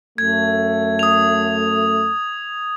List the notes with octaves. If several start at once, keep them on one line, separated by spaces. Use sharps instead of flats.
F#2 A3 G#6
D#6 F7